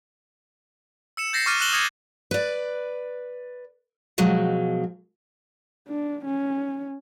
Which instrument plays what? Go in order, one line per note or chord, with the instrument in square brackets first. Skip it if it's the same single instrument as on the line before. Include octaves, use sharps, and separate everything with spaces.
[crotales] E6 C#7 E7
G6 A6 A#6 C7 C#7
C#6 D6 F6 A6 D#7
F#6 A#6 E7 F#7 G7
D#6 F6 G#6 A#6 C#7
[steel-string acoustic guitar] B4 D5
B2 F3 F#3 G#3
[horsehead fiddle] D4
C#4